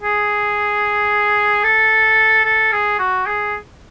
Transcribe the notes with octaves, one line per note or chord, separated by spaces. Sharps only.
G#4
A4
A4
G#4
F#4
G#4